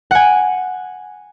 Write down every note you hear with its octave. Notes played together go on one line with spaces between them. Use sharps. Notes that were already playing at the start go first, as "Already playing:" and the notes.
F#5 G#5